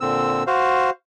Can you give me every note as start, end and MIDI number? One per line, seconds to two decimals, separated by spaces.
0.01 0.43 46
0.01 0.43 50
0.01 0.43 60
0.01 0.43 88
0.47 0.90 66
0.47 0.90 72
0.47 0.90 77